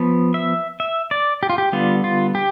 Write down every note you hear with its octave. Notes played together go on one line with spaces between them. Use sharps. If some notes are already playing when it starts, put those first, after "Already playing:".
Already playing: F3 B3
E5
E5
D5
G4
F4
G4
D3 G3 B3 F4
F4
G4